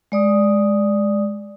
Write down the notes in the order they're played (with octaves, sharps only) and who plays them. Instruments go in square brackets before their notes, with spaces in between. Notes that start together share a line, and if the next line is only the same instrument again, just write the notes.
[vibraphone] G#3 D5 D#6